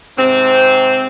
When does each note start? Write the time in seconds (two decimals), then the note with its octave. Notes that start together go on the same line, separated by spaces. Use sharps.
0.17 G#2 C3 C4